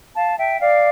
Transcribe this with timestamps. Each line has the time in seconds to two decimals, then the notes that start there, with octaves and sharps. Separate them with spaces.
0.16 F5 A5
0.39 E5 G5
0.60 D5 F5